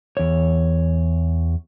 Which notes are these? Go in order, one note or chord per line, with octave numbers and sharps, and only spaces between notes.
E2 C#5